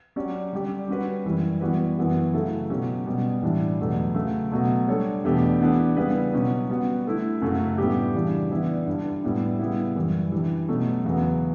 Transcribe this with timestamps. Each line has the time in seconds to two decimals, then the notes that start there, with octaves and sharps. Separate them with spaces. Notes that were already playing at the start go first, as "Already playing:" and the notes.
0.16 F#3 C#4 G4 D5
0.52 D3 G3 D4 G4 D5
0.88 G3 C#4 F#4 B4
1.25 F#2 E3 G3
1.61 E3 G3 B3 F#4 B4
1.97 F#2 E3 B3 F#4
2.34 C#3 F#3 A3 E4 A4
2.70 B2 F#3 C#4 G4
3.06 B2 G3 B3
3.42 A2 E3 G3 D4
3.79 E2 B2 F#3 A3
4.15 C#3 F#3 A3
4.51 B2 F#3 A3
4.88 G3 D4 A4 C#5
5.24 E2 B2 A3 D4 G4
5.60 E3 B3 D4
5.96 C#3 G3 B3 E4 B4
6.33 B2 F#3 C#4
6.69 G3 B3 F#4
7.05 D3 A3 E4
7.42 F#2 C#3 F#3 A3 E4
7.78 A2 G3 B3 D4 G4
8.15 C#3 E3 G3 D4
8.50 E3 B3 E4 G4 D5
8.87 G2 D3 G3 D4
9.23 A2 G3 B3 E4
9.59 C#3 G3 B3 E4
9.96 F#2 E3 G3
10.32 E3 G3 D4
10.68 B2 F#3 A3 C#4
11.05 E2 C#3 F#3 B3